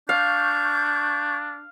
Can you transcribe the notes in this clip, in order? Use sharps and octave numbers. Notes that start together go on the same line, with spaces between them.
D4 F5 C#6 G6